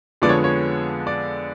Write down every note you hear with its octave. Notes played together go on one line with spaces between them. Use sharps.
F2 D3 F3 G#3 B3 D5
C#5
C#5
D5